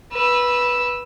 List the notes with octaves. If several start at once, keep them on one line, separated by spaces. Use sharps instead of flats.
B4 E6